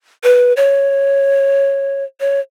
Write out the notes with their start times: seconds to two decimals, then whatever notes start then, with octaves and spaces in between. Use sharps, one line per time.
0.24 B4
0.57 C#5
2.20 C#5